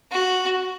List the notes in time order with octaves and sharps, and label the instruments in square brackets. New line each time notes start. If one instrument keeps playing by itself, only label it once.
[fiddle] F#4